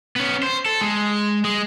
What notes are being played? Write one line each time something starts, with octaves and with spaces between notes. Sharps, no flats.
B3 C#4
C5
A4
G#3
G#3